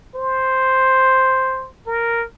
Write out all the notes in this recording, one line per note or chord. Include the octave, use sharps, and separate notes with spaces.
C5
A#4